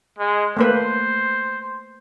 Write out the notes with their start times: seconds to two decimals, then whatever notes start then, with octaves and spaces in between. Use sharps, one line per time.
0.19 G#3
0.57 A3 A#3 B4 C5